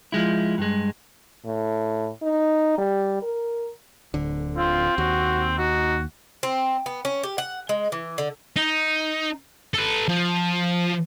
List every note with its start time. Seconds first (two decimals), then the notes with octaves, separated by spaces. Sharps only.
0.12 F3 G#3 E4
0.58 G2 G#3
1.45 A2
2.23 D#4
2.78 G3
3.22 A#4
4.14 D1 D3
4.58 C4 F4
4.98 D#2 F#4
5.58 D#4 F#4
6.43 C4
6.86 B3
7.05 C#4
7.23 G4
7.38 F#5
7.69 G#3
7.92 E3
8.18 D3
8.56 D#4
9.74 A4 B4
10.08 F3